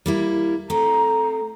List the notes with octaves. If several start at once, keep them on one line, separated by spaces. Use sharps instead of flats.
G3 A#3 E4
A3 C4 A#5